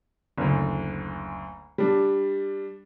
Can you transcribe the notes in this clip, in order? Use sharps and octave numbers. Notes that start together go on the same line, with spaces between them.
F#1 D2
G3 D4